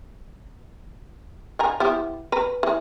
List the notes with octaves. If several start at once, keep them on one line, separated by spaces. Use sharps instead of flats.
D3 G#5 A#5
B3 E4 G4
B4 A#5
E3